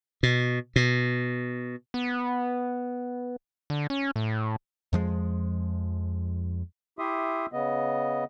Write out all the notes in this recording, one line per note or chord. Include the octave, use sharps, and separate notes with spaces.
B2
B2
B3
D3
C#4
A2
F2 F3 G#3
E4 G4 E5 C6 D#6
C#3 B3 D#5